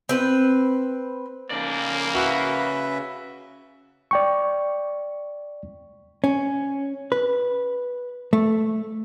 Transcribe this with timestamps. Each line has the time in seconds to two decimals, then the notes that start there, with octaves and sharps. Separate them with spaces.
0.09 C4 B4
1.50 C#3 A#3 D5
2.15 F#4 B4 E5
4.11 D5 G5 C#6
6.24 C#4
7.12 B4
8.33 A3